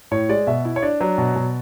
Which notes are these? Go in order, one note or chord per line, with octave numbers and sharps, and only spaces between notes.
A2 C#5
G#3 D5
B2 E5
E4
C#5
D4 D5
F#3
B2
B2